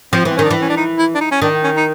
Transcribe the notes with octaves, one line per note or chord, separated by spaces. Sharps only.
F3 C4
E3 C4
D#3 C#4
D4
E3
C#4
D4
D#4
E4
D4
D#4
C#4
D#3 D4
C#4
D#4